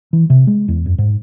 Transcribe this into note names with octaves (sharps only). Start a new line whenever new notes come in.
E3
C3
G#3
E2
F#2
G#2